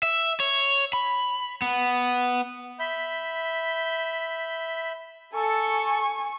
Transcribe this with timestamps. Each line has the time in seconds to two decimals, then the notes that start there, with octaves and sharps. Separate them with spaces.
0.03 E5
0.40 C#5
0.93 B5
1.62 B3
2.79 E5 B5 G6
5.34 A4 G#5 C#6